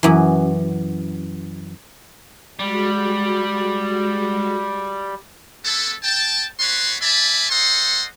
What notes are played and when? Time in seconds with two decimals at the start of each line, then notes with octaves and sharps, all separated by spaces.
0.03 F#2 E3
2.59 G3 G#3 F#4
5.64 A3 B3 E4 A4
6.03 G5 A5
6.60 B3 F#4 B4 C#5 C6
7.01 D5 E5 G#5 A5 B5
7.49 A4 C5 D#5 F#5 C6